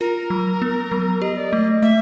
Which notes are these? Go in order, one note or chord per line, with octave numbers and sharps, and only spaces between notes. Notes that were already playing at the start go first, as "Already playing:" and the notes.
F4 A#4
F#3
B3
F#3
G4 D#5
D5
A3 D#5
A3 E5